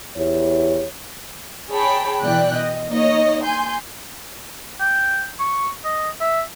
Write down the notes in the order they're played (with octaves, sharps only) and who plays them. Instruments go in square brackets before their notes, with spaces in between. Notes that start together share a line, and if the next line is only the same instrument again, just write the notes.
[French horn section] E2 E4 G4 C#5
[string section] G#4 C#5 G5 A5 B5
B2 E3 D5 G5 F#6
D#5
A#3 D#4 C#5 D#5
G#5 C6 G6
[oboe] G5
C#6
D#5
E5